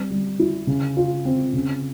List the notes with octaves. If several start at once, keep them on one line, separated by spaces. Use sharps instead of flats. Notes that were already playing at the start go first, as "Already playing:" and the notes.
Already playing: G3 C4
G3
E4
C#3
F4
C4
C#3